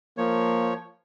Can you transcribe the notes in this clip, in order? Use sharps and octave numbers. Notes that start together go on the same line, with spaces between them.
F3 A#3 C#5